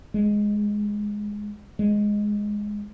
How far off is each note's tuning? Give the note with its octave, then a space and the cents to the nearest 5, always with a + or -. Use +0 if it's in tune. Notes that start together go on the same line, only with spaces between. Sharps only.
G#3 +0
G#3 +0